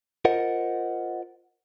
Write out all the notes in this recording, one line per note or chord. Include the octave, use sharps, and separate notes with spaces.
F4 A#4 C5 D#5 F#5